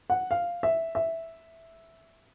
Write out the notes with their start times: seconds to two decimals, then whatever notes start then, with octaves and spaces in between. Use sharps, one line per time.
0.10 F#5
0.31 F5
0.63 E5
0.95 E5